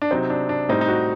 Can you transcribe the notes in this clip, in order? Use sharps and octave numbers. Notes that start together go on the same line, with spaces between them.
D4
C3 F#3 C4 D#4
D4
D4
A2 G3 C4 D#4
D#4
F#4